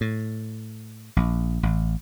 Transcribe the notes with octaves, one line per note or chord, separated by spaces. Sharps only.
A2
A#1
A1